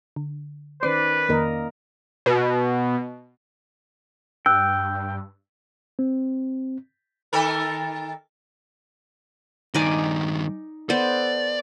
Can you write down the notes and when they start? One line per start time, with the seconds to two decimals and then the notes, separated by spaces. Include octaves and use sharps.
0.16 D3
0.83 D#3 C#4 B4 C5 D5 D6 C7
1.29 F2 D#3 A#3 A#4 D#5
2.26 B2
4.46 G2 G5 E6 F#6
5.99 C4
7.33 D#3 A4 A#4
9.74 G2 D#3 D#4 D5 G#5
10.90 B3 A4 C5 D5